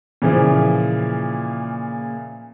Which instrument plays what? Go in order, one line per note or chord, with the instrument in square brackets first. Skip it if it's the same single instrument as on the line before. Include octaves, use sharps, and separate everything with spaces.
[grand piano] A#2 C#3 E3 F3